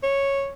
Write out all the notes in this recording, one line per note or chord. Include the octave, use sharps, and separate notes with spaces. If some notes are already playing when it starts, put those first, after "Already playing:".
C#5